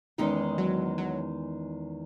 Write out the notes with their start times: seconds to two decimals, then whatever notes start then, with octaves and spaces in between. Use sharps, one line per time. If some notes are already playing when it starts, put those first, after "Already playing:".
0.18 E2 D#3 G#3 C#4 D#4
0.58 F#3
0.98 F#3